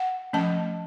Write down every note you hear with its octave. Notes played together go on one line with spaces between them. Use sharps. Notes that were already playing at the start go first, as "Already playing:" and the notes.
Already playing: F#5
F3 A3 C#4 A5